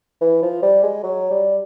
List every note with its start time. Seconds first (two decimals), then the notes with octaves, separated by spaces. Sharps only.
0.21 E3
0.42 F3
0.63 G3
0.83 G#3
1.03 F#3
1.31 G3